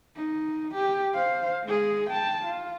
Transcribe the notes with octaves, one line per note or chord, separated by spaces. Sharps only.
D#4
G4
C5 F5
G#3 G#4
G5 A5
F4